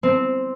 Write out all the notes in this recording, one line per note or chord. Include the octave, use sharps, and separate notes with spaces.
C4